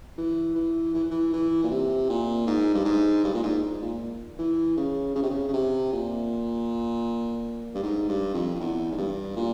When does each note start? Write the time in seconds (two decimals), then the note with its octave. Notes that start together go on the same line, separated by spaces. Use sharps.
0.18 E3
0.55 E3
0.94 E3
1.11 E3
1.33 E3
1.64 A#2
1.71 C3
2.09 A#2
2.47 G#2
2.74 G2
2.85 G#2
3.24 G2
3.34 A#2
3.43 G#2
3.62 G#2
3.82 A#2
4.39 E3
4.77 C#3
5.15 C#3
5.22 C3
5.30 C#3
5.48 C#3
5.53 C3
5.92 A#2
7.74 G2
7.83 G#2
8.08 G2
8.34 F2
8.55 F2
8.60 E2
8.91 G#2
8.98 G2
9.36 A#2